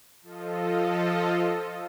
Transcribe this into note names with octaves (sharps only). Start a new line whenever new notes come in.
F3 F4 A4 D#5